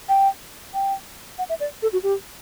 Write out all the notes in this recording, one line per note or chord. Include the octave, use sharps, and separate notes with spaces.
G5
G5
F#5
E5
D5
A4
F#4
G4